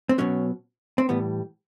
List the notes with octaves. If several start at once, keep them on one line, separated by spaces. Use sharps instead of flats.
C4
B2 F#3 C#4
C4
A2 E3 G3 B3